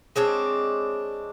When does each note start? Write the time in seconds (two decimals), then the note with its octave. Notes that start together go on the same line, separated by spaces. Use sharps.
0.16 G#3 C4 D4 C#5